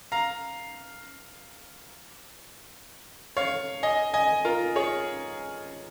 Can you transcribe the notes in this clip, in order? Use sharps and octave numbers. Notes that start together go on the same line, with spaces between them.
F5 A#5
C#5 F5
D#5 G#5
D#5 G#5
F4 A#4
G#4 C#5